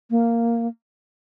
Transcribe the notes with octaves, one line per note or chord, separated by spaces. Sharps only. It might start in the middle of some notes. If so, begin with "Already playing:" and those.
A#3